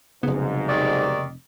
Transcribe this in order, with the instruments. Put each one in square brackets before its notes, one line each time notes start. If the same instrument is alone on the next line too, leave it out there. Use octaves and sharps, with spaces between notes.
[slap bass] F1 B3 [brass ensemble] B1 G#2 [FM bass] C#3
[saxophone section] D#2 D#3 D5